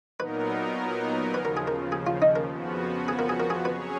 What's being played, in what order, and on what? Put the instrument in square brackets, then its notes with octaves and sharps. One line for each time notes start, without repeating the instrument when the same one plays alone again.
[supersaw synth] A#2 F#3 B3 D#4 A#4 [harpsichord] B4
[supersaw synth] D#2 C#3 F3 [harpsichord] B4
[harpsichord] A#4
G#4
A#4
G#4
F4
D#4
A#4
[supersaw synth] F2 C#3 F3 B3 F#4
[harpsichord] G#4
A#4
G#4
A#4
G#4
[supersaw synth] F#3 C#4 G#4 C#5 [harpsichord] B4